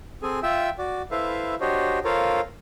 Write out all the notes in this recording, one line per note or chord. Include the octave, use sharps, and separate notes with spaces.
C4 G#4 A4 G#5
F4 E5 G5 E6
F#4 D5
E4 A4 B4 C5 E5 F5
D4 F#4 G4 C5 C#5 D#5
F4 A4 A#4 C5 C#5 F5